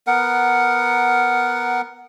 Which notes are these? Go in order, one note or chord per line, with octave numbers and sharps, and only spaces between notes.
B3 A#4 F#5